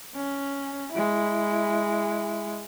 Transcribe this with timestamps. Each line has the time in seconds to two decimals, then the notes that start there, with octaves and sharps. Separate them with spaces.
0.14 C#4
0.92 G#3 E4